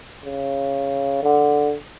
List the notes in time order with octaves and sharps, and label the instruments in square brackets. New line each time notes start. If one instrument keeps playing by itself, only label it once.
[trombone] C#3
D3